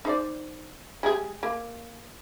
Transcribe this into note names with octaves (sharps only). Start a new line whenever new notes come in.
D#4 C5 D5
G#3 G4 G#4
A#3